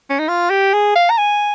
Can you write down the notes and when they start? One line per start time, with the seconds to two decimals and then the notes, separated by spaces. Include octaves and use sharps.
0.10 C#4
0.19 D#4
0.29 F4
0.51 G4
0.74 G#4
0.96 F5
1.10 A#5
1.18 G#5